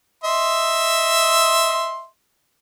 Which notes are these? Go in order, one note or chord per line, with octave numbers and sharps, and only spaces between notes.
D#5 E5 C6